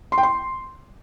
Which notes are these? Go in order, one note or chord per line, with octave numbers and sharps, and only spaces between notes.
C6
G5
C6